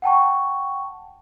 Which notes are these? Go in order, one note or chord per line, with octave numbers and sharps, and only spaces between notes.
F#5 G5 A5 C#6